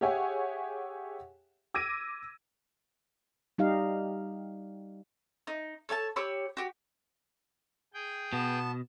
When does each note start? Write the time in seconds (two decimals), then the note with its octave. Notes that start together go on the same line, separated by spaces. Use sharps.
0.01 G4 G#4 C#5 E5 F#5 G#5
1.74 D6 E6 G#6 A#6 D7 D#7
3.58 G3 D#4 G4 F5
5.47 D#4
5.89 A4 C#5 F5 A5
6.16 G4 C#5 B5 E6
6.57 F#4 G4
7.94 G#4 G5
8.33 B2 B3 A5